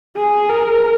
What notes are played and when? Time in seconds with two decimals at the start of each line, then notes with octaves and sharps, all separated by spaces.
0.16 G#4
0.49 A#4